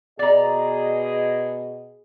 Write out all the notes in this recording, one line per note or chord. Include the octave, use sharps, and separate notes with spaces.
B2 G#4 D5 D#5 A#5